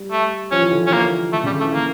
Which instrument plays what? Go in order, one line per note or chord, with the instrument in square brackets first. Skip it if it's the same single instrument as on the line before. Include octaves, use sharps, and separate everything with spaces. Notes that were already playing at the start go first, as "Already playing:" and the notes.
Already playing: [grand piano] G3
[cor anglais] A3
[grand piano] F3 [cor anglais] C#4
[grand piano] E3
D3
E3
[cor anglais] C#4
A#3
[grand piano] D3 [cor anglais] A3
[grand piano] C#3 [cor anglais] G3
[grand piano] D3
[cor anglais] A3
[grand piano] E3
[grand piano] D3 [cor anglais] A#3